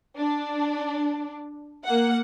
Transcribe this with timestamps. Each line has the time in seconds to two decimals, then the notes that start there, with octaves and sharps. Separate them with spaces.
0.17 D4
1.85 A#3 F#5